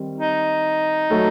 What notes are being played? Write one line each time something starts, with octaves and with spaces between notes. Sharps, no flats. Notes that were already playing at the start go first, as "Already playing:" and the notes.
Already playing: D#3 G3 C4
D#4
F#3 A3